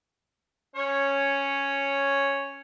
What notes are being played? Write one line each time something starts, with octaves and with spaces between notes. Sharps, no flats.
C#4 C#5